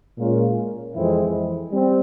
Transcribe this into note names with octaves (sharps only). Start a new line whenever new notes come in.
A#2 G#3 C#4 F4 A#4
F2 E3 G#3 C4 E4
G3 C4